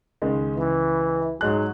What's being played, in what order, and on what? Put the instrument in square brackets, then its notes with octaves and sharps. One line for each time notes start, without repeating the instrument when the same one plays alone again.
[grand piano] C#2 D#3 G#3
[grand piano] C#2 [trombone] E3
[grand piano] G#2 G#3 F#6 [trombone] F#3